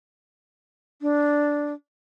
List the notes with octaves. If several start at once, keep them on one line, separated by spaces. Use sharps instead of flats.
D4